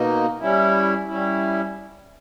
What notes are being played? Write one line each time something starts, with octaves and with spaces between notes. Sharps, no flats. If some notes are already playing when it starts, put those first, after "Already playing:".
Already playing: B2 A#3 D#4
G3 C#4 E4
G3 C#4 E4